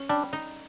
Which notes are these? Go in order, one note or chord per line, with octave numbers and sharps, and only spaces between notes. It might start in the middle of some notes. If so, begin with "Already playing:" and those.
Already playing: C#4
G3 D4
D#4